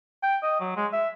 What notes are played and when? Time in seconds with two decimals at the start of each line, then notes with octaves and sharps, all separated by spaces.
0.23 G5
0.43 D#5
0.60 F#3
0.76 G#3
0.93 E5